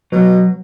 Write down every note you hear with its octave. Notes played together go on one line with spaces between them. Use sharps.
B2 F#3